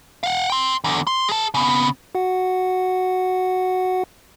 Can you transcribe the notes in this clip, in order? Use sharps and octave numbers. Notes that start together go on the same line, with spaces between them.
F5 F#5
G5 C6
E2 D3
C6
G#4 A5
C#3 B3
F#4 F#5